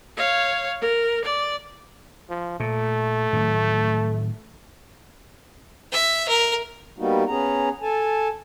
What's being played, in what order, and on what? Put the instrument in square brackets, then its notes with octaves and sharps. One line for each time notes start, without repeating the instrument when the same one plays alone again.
[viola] C#5 F5
A#4
D5
[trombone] F3
[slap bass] A#2 [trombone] A3
[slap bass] A2 D#3 F#3
[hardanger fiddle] E5
A#4
[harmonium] G3 A#3 B3 D#4 F#4
B3 C#4 G#4 A#5
A4 G#5 A5